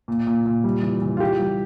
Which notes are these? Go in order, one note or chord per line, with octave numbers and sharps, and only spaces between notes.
A#2
A#2
A#2
G3
E3
E3
F4
E3 G4
G3